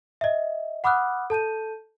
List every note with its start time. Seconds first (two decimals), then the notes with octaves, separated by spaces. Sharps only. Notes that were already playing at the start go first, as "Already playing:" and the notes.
0.21 D#5 E5
0.84 F#5 B5 D6 D#6 F6 F#6
1.30 A4 A5 G6 D#7